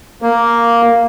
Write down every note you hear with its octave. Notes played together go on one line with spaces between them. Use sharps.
A#3